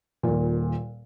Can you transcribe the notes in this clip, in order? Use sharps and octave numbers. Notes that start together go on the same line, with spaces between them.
D#1 A#2